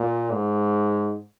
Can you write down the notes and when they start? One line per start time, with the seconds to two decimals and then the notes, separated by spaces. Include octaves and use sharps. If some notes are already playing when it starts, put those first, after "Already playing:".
Already playing: A#2
0.31 G#2